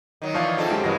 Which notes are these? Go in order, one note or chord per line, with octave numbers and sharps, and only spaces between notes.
D#3 F#3
E3 F3 C#5 D5 F5
D3 C4 D#4 F4 G#4 A4
F#2 G#3 G4 A5
G2 C#3 E3 G#3 A#4 A#6